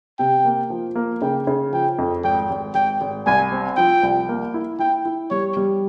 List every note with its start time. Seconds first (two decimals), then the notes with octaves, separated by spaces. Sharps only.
0.19 C3 G5
0.45 A#3
0.70 F3
0.95 A#3
1.22 C#3 G5
1.47 C#3
1.73 F3 G5
1.98 F2
2.24 G#1 G5
2.50 G#1
2.75 G#1 G5
3.01 G#1
3.26 C2 G#5
3.52 C4
3.77 F3 G5
4.03 C2
4.29 A#3
4.54 E4
4.79 E4 G5
5.05 E4
5.31 G3 C#5
5.57 G3